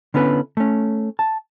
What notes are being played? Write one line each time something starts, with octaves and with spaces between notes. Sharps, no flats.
D3 B3 C#4 E4 B4
A3 C#4
A5